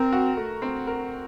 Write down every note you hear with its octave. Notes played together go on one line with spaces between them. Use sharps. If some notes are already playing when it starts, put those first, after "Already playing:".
Already playing: C4 A#4
F#4
A3
C4
A#4